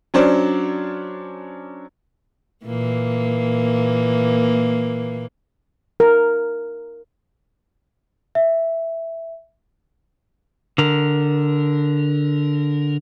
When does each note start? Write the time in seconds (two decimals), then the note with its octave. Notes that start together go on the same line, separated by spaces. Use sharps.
0.14 F#3 C#4 D4 C5 D5
2.65 A#2 E3 A#3
6.00 A#4
8.35 E5
10.78 D3 A#4